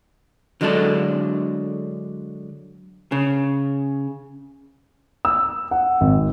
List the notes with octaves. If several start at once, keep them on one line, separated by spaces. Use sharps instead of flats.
D3 F#3 G#3 D4 A4
C#3
E6
F#5
G#1